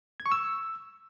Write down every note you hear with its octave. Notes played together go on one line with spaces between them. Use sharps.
G#6
C#6
E6